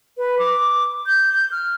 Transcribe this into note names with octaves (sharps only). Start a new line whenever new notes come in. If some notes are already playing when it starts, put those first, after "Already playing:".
B4
D6
G6
G6
F6